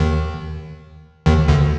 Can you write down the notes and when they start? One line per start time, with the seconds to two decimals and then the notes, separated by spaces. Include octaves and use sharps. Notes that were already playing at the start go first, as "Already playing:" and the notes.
Already playing: D#2 D#3
1.26 D#2 D#3
1.48 D2 D3